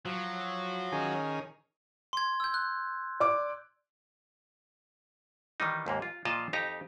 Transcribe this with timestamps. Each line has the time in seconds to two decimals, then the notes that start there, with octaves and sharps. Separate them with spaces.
0.06 F3 F#3
0.92 D#3 C#4 G#4
2.13 C6 G#6
2.40 E6 G6
2.54 F#6
3.20 D5 D6
5.60 D#3 E3 G3 D#4
5.86 D#2 G#2 A#3
6.02 F4
6.25 A#2 F3 F4 D#5 F5 A5
6.53 F2 D#4 G4 A#5